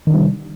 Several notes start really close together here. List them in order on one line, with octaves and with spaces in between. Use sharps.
D#3 D4 G3 C3